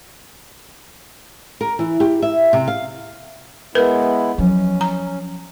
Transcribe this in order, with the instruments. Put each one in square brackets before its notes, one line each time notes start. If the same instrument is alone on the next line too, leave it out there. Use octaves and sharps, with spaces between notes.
[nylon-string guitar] A#4
E3
G4
E5
C3
F5
[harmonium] G#3 B3 E4 [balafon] A#4 B4
[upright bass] F3 F#3 [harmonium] C#4
[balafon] A#5